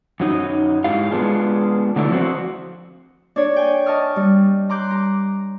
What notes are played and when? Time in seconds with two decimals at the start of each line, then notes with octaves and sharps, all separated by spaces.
0.20 F#2 F#3 D#4
0.84 G#2 E4 G4 F5
1.11 G#3 B3 D4 F4 G#4
1.96 D3 F#3 A3 E4 D5
2.10 F3 C4 F#4 C5
3.36 D4 C#5 D5
3.56 G5 G#5
3.86 D#5 A5 C#6 D#6 F6
4.16 G3
4.69 A#5 C6 D6 F#6 G6
4.91 A#5